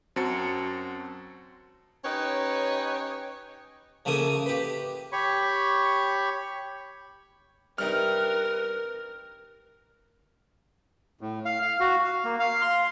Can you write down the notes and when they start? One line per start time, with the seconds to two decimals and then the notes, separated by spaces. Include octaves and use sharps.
0.16 F#2 C4 F#4 A5 C#7
2.04 C#4 D#4 G4 B4 C#5
4.05 C#3 F3 A3 A#3 G#5 D#6
4.46 G4 B4
5.12 G4 C#5 B5 C#6
7.78 G2 C3 D#4 A#4 B4 F6
11.21 A2
11.45 F5
11.62 F5
11.80 F#4
12.04 F5
12.24 A#3
12.39 F5
12.62 C6